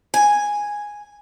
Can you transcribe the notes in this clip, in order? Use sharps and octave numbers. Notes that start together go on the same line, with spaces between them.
G#5